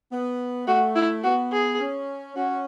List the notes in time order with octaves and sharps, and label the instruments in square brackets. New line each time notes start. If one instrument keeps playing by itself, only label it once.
[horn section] B3
[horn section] A3 [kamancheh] F#4
[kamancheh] E4
[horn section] B3 [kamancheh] F#4
[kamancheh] G#4
[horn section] C#4
[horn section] C#4 [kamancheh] F#4